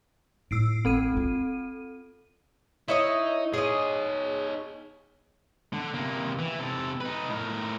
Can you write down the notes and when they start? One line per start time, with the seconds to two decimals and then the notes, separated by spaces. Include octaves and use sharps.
0.51 A2 E6 C7 D7
0.85 A1 C4 A4 D#7
1.12 D#4 F4
2.88 D#4 E4 C#5 D#5
3.54 D#4 G#4 C#5 D#5
5.73 D3
5.94 C3 A#3
6.39 E3
6.59 C3 A4
7.01 D#4 B4
7.29 A2 A#4